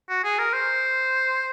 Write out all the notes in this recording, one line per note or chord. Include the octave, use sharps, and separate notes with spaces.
F#4
G#4
A#4
C5